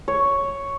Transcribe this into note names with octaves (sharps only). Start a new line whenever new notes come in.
C#5